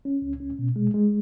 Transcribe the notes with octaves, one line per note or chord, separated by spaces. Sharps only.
C#4
C#2
C#4
B2
G#3
G#3